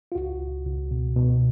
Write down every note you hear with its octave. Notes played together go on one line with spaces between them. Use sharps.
F4
C#2 F#4
C#2
C#2
B2
B2